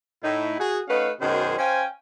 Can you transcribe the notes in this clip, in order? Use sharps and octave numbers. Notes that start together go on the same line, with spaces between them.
A2 D#4 E4
F#4 G#4
A3 C#4 D#4 B4 F5 F#5
F#2 B2 D#3 C#4 G#4 C5
C#4 C5 F5 G5 G#5